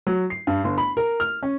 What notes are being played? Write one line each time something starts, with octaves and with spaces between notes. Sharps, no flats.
F#3
C7
G2
G1
B5
A#4
F6
C#4